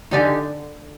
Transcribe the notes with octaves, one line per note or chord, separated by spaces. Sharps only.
D3 D#4 G4 D5 G#5